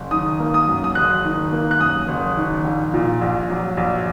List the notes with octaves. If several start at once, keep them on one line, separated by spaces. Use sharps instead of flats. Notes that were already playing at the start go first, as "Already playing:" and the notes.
Already playing: F#1
D#3 D#6
A#3
D#6
F#2
D#6
F#1 F#6
D#3
A#3
F#6
F#2 D#6
F#1
D#3
A#1
A#2
A#1
F#3
A#1